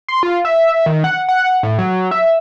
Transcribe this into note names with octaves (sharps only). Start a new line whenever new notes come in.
C6
F4
E5
D#3
F#5
F#5
A2
F#3
E5